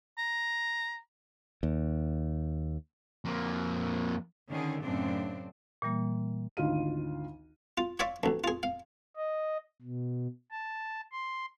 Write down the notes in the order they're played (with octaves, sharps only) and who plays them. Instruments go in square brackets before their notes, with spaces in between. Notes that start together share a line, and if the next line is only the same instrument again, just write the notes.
[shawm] A#5
[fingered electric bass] D#2
[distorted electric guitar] F2 A#3
[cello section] D3 D#3 C#4 G#4
F#2 A2 C#3 C4 D4
[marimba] A#2 E3 G3 A#3
[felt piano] G#1 D2 D#4 F4 F5 D#7
[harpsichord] F4
C#5 D5 E5 F5 C6 D6
A1 D2
F4 G#4
F5
[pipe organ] D#5
B2
A5
C6